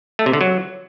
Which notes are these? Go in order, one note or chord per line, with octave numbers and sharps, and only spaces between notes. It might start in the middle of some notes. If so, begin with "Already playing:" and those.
A3
C3
D3
F#3